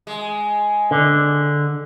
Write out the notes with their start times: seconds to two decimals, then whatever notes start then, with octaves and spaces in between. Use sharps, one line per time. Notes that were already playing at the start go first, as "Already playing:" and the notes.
0.07 G#3
0.91 D3